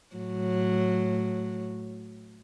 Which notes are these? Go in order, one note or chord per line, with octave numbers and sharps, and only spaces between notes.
A2 F#3